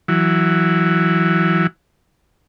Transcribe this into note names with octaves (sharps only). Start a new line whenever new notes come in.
E3 F#3